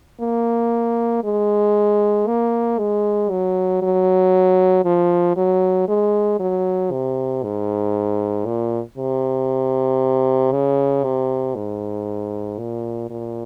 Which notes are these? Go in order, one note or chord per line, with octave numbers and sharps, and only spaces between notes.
A#3
G#3
A#3
G#3
F#3
F#3
F3
F#3
G#3
F#3
C3
G#2
A#2
C3
C#3
C3
G#2
A#2
A#2